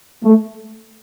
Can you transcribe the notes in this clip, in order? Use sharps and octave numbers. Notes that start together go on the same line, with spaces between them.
A3